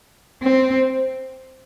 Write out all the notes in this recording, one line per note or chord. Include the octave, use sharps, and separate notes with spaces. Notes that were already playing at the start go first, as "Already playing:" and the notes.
C4